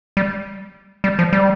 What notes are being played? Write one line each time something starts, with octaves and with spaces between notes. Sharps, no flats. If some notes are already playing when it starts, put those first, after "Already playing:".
G3
G3
F3
G3